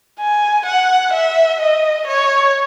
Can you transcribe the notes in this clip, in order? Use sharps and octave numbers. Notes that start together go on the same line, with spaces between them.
G#5
F#5
E5
D#5
C#5